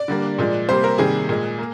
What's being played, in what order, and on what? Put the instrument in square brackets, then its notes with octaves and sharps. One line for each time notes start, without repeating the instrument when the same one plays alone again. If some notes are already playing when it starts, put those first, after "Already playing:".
Already playing: [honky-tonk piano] D5
D3 G3 A#3
A#2 F3 G#3
C3 G3 A#3 C5
A#4
C3 D#3 G3 A#3 G#4
A#2 G#3
A#3